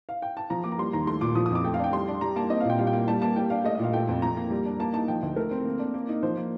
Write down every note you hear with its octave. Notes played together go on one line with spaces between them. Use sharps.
F5
G5
A5
F3 A#5
A#3 D6
A#5
G3 C6
D#2 A#5
A3 C6
A#2 D6
F3 D#6
D#6
F2 D6
A3 G5
F5
D4 G5
G3 C6
D4
G3 A#5
A#3 A5
C4 D#5
F5
A#2 G5
G3 F5
G5
A#3
G3 A5
A#3 A5
G3 G5
D4 F5
A3 D#5
D#5
A#2 F5
A3 G5
F2
F3 A#5
A#3
G3
D4
A#3 A5
D#4 A5
F3 G5
D2
A3 A#4
C4
A#3
D4
A#3
D#4
F3 C5
A#3